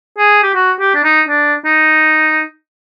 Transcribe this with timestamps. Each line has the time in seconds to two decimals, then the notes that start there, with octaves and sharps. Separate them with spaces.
0.18 G#4
0.43 G4
0.55 F#4
0.80 G4
0.95 D4
1.04 D#4
1.28 D4
1.65 D#4